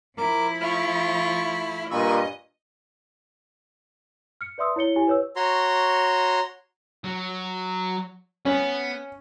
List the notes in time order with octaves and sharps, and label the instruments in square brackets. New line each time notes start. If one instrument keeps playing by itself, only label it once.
[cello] F3 E4 [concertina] A#4 D6
[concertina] A3 B5 F6 [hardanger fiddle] F4 C#6
[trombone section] G2 A#2 [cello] D#5 [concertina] B5 C#6 E6
[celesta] F6 C#7
B4 D5 E5 C6 D#6 E6
E4 C#5 C#7 G7
E4 G4 G#5
B4 C#5 E6
[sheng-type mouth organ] F#4 C#5 A#5 C6
[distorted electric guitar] F#3
[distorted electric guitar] B3 [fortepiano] C#4